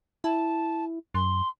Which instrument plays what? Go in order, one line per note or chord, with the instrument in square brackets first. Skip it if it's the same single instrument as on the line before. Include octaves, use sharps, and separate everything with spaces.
[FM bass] E4 [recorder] A5
[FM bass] F#2 [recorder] C6